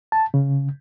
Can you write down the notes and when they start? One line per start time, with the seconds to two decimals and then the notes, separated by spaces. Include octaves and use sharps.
0.12 A5
0.34 C#3